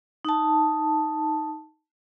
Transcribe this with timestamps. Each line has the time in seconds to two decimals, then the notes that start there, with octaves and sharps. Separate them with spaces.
0.25 D#4 A5